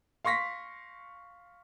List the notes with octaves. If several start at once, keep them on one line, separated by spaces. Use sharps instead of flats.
F5 C6 C#6 A#6 B6